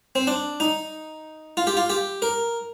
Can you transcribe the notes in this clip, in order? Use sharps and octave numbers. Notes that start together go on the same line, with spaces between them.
C4
D4
D#4
F4
G4
F4
G4
A#4